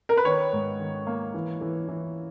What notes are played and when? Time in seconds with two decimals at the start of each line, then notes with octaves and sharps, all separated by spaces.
0.09 A#4
0.17 B4
0.25 D#3 C#5
0.53 G#2
0.80 D#3
1.07 A#3
1.34 E3
1.61 E3
1.88 E3